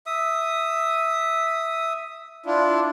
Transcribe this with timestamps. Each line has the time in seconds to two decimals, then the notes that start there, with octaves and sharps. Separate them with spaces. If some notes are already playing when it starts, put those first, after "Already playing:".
0.06 E5 D#6
2.46 D4 E4 F4